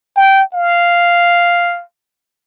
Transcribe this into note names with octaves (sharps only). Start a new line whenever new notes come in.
G5
F5